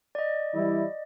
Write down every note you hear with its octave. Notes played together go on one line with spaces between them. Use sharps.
D5 D#5
E3 G3 E4